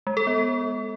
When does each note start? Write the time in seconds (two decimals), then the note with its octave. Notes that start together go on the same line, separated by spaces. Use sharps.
0.07 G#3
0.17 A4
0.27 B3